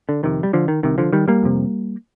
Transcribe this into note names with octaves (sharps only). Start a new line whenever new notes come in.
D3
F2 C3 D#3
G3
D3 F3
D#3
C2 C3 D#3
D3 F3
D#3 G3
G3 A#3
F2 C3